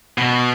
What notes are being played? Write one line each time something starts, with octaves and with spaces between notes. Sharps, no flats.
B2